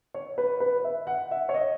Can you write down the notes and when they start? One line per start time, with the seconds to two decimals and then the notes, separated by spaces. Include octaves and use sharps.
0.14 C#5
0.38 B4
0.60 B4
0.84 E5
1.07 F#5
1.31 E5
1.49 C#5
1.54 D#5